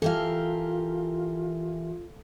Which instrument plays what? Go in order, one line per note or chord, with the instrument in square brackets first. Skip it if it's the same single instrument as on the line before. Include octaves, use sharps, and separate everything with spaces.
[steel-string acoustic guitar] E3 G4 A#4 [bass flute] F4 [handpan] A4 F5